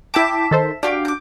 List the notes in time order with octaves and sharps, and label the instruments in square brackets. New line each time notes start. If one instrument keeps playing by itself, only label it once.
[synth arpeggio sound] E4 G5 D6 [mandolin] E5 A5
[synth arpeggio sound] D#3 A4 C5
[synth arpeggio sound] D4 F#4 [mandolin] G4 F5 G5
[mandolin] D6 G6